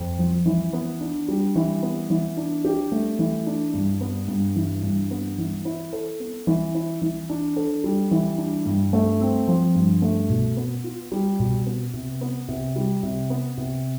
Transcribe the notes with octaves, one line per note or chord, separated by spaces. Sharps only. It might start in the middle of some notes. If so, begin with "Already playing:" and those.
Already playing: F2
F3
E3
B3
D4
G3
E3
B3
E3
D4
G4
A3
E3
D4
G2
B3
G2
E3
G2
B3
E3
E4
A4
B3
E3
E4
E3
D4
A4
G3
E3
D4
G2
A3
C4
F3
G2
A3
B2
B3
F4
G3
B2
B3
C3
B3
C3
G3
C3
B3
C3